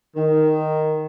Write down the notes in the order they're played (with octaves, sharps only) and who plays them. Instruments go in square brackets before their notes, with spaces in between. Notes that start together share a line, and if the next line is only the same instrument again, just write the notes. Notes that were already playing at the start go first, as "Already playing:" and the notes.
[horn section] D#3